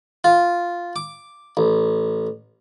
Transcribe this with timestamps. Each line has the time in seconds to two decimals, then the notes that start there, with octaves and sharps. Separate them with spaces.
0.24 F4
0.96 D6
1.57 A1